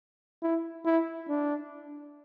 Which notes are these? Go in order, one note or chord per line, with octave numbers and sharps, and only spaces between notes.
E4
E4
D4